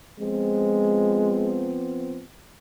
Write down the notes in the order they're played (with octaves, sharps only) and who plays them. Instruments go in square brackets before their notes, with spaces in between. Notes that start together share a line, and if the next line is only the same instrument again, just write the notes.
[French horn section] F3 B3 C4 [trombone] G#3